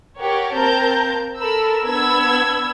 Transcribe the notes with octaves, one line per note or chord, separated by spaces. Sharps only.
G4 A#4 C#5 F#5
A#3 C4 A#4 A5 A#5 G6
A4 A#4 B5 E6
B3 D4 B5 E6 G#6